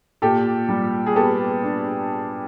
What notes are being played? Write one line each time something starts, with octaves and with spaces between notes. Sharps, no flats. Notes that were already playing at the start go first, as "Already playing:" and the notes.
A#2 G4 A4
G3
G#4
B3 G4 A4
D4